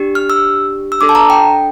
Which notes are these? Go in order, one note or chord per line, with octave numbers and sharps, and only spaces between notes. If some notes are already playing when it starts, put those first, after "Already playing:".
Already playing: D4 G4
F6
E6
E6
D4 A4 D6
A5
A#5
G5